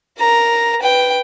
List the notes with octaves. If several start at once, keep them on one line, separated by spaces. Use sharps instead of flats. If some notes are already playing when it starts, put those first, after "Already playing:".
A#4 A#5
B4 G5